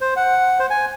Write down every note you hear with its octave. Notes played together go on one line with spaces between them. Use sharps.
C5
F#5
C5
G#5